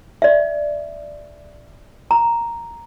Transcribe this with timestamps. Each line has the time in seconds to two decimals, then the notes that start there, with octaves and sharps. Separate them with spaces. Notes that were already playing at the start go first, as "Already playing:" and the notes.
0.22 D5 E5
2.11 A#5